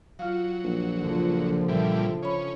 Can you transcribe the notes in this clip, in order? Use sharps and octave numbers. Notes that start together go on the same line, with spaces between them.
F#3 F4 F5
A#1
C#2 D3 F3
A#2 E3 G3 E5
C#4 C#5 B5